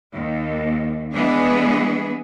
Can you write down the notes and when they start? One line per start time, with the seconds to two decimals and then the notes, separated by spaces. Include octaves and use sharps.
0.13 D#2
1.12 E3 G#3 B3 D4 G#4